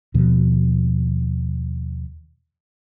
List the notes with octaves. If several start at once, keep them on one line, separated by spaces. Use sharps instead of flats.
D#2 B2 F3